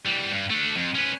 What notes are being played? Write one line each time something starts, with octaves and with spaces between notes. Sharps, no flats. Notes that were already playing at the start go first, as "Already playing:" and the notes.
E3 G3
G2
A3 D4
F2
C#4 B4